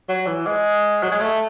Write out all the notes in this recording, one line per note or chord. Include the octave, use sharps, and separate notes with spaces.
F#3
E3
G#3
F#3
G#3
A3